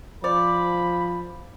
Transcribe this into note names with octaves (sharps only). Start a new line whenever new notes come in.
F3 C5 D5 B5